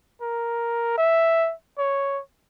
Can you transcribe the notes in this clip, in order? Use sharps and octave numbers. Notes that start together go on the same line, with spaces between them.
A#4
E5
C#5